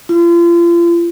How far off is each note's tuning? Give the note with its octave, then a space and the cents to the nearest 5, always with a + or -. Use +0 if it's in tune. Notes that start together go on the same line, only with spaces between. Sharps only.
F4 -35